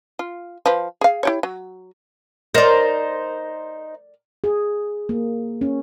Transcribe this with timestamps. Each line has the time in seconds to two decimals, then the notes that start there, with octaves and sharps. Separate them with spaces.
0.19 F4
0.66 F3 B4
1.01 G#4 F5
1.23 E4 G4 C#5
1.43 F#3
2.55 D#4 A#4 C5 D5
4.44 G#4
5.09 A#3
5.61 C#4